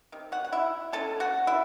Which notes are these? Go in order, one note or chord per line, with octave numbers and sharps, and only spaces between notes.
C3 D#3
F#4 F#5
F#5
E4 E5
F#3 C#4 E4 A4 A5
F#4 F#5
E4 E5